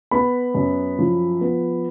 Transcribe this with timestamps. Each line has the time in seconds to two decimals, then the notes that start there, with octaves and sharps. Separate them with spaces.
0.11 B3 B5
0.55 F#2
0.99 F3
1.41 B3